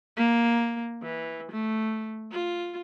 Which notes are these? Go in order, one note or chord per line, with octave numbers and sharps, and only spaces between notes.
A#3
E3
A3
F4